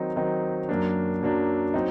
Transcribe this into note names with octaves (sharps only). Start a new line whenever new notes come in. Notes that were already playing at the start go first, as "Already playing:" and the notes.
Already playing: D#3 F#3 C4 D#4
D#3 F#3 C4 D#4
F#2 F#3 A#3 D4
F#2 F#3 A#3 D4
F#3 C4 D#4